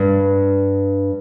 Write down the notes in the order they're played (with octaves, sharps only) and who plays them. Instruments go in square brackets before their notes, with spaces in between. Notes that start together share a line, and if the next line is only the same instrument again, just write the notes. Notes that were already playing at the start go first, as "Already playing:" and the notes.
Already playing: [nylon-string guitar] G2